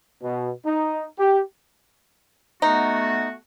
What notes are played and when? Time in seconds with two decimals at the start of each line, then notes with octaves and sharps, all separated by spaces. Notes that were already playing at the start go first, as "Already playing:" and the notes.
0.21 B2
0.64 D#4
1.18 G4
2.62 A3 B3 D#4 F#4